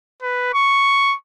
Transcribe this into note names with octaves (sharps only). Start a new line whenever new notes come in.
B4
C#6